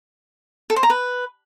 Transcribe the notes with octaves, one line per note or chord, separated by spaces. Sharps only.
A4
C5
A#5
B4